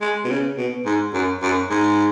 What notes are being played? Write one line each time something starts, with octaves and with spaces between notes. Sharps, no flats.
G#3
B2
C#3
B2
G#2
F#2
F#2
G#2